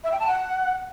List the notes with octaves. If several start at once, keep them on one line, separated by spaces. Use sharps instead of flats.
E5
G5
A5
F#5